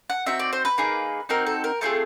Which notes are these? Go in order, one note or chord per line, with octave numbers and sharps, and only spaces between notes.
F#5
C4 D#4 F#4 E5
D5
C5
B4
A#3 D#4 G#4
C4 D#4 F#4 A#4
A4
A#4
A3 C4 F4 G#4 A4